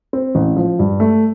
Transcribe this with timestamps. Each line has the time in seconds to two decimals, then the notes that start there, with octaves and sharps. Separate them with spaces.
0.13 C4
0.35 A1
0.56 F3
0.79 G2
1.00 A3